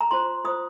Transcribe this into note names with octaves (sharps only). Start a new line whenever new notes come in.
A#5
F4 C5 C6
F4 C5 D#6